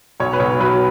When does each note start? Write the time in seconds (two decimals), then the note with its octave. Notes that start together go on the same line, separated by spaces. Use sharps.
0.20 B1 C#5
0.33 B4
0.39 B1 C#5
0.60 F#3 B4